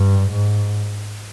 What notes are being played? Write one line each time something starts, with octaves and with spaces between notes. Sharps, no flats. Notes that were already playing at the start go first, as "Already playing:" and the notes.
Already playing: G2
G#2